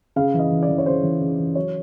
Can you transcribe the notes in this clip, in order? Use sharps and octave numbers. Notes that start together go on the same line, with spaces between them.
C#3 F5
E3
D#5
E3
D5
E3
C#5
C#3 C5
E3
C#3
E3
F#3 C#5